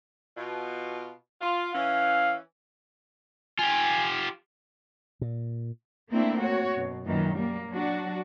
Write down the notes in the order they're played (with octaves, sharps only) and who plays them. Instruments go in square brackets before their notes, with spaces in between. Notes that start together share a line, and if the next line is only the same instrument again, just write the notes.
[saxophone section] B2 F4
F4
[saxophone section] E3 C#4 [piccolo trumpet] F5
[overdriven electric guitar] F4 G4 [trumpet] G#5
[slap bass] A#2
[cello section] A3 A#3 C4 D4 E4
F#4 C#5
F#2 B2
F#2 A#2 D#3 E3
G3 A#3
F#3 D4 F#4